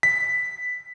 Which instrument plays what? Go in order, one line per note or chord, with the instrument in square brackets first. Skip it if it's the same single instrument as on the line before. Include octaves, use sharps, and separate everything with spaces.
[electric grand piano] B6